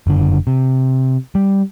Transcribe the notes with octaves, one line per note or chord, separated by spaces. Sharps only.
F#1 D3
C3
G3